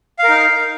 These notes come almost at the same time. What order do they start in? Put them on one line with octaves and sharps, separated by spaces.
F5 A#4 D#4